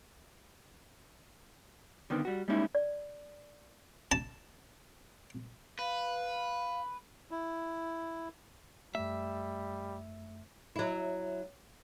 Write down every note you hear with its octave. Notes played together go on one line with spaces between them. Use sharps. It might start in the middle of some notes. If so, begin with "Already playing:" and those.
D3 D#3 B3 C4
G3 F#4
G3 G#3 A#3 C#4 D#4 E4
D5
A5
B4 F5
E4
F#2 G3 A3 E5
F#3 E4